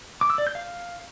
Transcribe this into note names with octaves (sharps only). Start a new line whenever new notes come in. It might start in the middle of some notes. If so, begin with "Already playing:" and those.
D6
E6
D5
G6
F5